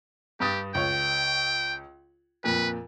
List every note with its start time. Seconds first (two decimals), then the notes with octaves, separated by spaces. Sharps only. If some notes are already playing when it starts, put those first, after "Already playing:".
0.40 G2 G4 D#6 A6
0.75 C#2 C#5 G5
2.44 F2 A#2 B4